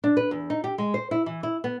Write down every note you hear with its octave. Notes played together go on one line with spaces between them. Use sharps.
D4
B4
E2
D#4
G4
G#3
C5
E4
E3
E4
B3